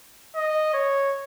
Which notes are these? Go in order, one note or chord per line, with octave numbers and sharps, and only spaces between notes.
D#5
C#5